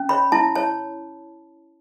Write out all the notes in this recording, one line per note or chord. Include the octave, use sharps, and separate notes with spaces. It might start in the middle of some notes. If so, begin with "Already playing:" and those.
Already playing: C#4
C#5 B5
E4 A5
C#5 A5